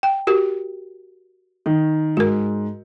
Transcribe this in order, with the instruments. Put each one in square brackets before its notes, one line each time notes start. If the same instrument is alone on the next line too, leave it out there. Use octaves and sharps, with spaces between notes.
[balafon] G5
F#4 G4 A#4
[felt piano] D#3
[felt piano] G#2 [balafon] F#4 A#4